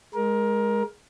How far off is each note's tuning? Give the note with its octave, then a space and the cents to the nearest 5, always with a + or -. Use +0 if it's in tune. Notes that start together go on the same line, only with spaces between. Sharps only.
G#3 +0 A#4 +20